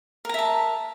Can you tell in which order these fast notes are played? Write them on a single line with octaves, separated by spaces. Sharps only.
A#4 A#5 E5 A5